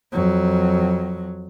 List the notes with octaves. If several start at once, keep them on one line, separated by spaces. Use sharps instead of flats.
F2 F#3